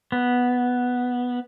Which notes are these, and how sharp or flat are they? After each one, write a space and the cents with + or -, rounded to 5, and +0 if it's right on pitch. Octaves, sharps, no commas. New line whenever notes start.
B3 -5